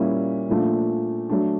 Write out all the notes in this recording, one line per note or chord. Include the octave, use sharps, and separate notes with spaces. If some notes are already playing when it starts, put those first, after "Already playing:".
Already playing: A#2 G3 A#3 C#4 E4
A#2 F3 A3 D4
F#3 A3 D4